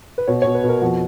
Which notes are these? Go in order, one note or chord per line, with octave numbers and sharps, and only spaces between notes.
B4
B2 C#5
B2 C#5
B4
B2 A#4
F2 F#4